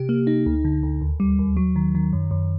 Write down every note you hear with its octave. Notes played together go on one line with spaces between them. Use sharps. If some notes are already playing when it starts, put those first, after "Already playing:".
Already playing: C3 G4
A#3
D#4
D2
D3
D2
D#2
G3
D#2
F#3
D#3
D#3
F#2
F#2